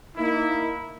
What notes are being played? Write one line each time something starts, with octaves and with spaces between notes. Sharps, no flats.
A#3 D#4 E4